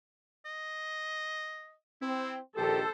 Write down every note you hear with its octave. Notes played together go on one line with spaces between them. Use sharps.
D#5
C4 E4
A#1 D#3 G4 A4 C5